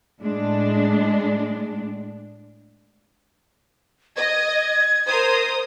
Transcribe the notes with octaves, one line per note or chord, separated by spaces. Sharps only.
A2 G#3 D4
D#5 G#6
A#4 C5 D#6